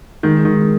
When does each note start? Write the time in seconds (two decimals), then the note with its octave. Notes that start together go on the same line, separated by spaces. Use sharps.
0.23 D#3 G#3
0.45 D#3